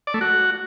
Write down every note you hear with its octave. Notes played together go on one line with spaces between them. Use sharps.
D5
A3
F#4